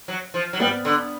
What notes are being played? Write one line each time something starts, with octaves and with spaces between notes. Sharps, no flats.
F#3
F3
F#3
G3 B3
D3